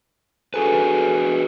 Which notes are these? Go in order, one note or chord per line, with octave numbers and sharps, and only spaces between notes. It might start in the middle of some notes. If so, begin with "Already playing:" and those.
F#4 G#4 A4 B4 G#5